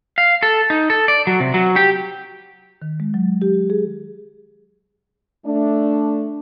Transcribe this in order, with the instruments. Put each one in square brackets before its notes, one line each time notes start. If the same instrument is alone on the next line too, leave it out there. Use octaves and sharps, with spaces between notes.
[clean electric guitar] F5
A4
D#4
A4
D5
F#3
C3
F#3
G4
[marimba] D#3
G#3
F#3
G4
G#4
[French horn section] A3 D4